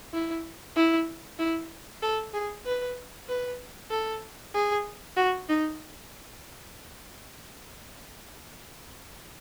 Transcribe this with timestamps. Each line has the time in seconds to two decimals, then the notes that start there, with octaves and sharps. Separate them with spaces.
0.13 E4
0.76 E4
1.39 E4
2.02 A4
2.34 G#4
2.66 B4
3.28 B4
3.91 A4
4.54 G#4
5.17 F#4
5.49 D#4